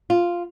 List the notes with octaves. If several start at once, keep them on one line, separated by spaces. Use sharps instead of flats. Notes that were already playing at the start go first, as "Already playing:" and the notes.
F4